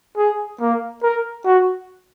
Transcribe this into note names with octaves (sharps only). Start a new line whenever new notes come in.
G#4
A#3
A#4
F#4